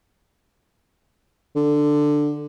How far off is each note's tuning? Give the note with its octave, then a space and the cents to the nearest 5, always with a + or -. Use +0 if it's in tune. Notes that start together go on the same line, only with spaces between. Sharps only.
D3 +10